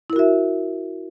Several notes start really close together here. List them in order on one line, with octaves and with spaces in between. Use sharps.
E4 A#4 F#4 E5